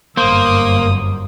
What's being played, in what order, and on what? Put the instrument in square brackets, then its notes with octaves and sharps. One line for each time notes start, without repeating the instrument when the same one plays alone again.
[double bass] G1 F#2 [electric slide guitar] A#3 [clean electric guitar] C5 [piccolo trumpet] D#6